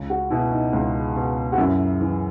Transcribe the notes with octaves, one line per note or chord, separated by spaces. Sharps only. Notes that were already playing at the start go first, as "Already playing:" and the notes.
Already playing: C#2
F#4
B2 E4
D#4
C#2
B2
F#4
F#2 E4
E3